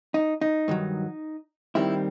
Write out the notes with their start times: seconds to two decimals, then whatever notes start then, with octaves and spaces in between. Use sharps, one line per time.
0.14 D#4
0.41 D#4
0.68 G2 D#3 F#3
1.75 D#2 D#3 G3 C4 E4